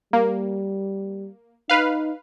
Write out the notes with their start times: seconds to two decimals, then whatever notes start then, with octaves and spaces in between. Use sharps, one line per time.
0.13 G3 A#3
1.69 D#4 B4 F5